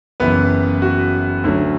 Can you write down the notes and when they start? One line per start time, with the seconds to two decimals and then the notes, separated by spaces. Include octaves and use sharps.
0.20 F#1 F#2 E3 B3 B4
0.82 F#4
1.44 D2 D3 F#3